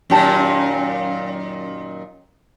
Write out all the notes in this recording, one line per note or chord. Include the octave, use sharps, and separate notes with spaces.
F#2 A#2 D#3 C#4 G4 A5